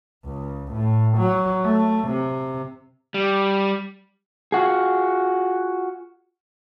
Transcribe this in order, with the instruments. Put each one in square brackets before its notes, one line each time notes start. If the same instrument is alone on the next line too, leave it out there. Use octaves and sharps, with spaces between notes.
[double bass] C#2
A2
F#3
A3
C3
[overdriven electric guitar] G3
[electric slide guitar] F4 F#4 G#4